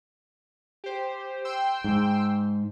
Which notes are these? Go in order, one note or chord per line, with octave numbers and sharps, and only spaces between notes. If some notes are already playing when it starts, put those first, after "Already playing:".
G4 C5
G5 C6 E6
G#2